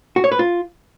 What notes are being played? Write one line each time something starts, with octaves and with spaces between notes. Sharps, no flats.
F#4
C#5
B4
F4